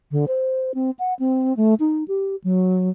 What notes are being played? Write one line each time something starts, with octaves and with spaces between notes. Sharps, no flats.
D3
C5
C4
F#5
C4
A3
D#4
G4
F#3